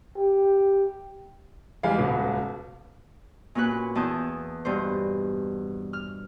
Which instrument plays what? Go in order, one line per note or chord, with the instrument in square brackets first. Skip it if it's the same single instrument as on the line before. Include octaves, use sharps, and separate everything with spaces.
[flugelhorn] G4
[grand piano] E2 G3 G#3 F5
D#1 C#2 B2
[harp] A#2 A#3 C#4 F#4 B4 F#6
F#6
E2 A5 D#6 G6
G2 B2 C5
F6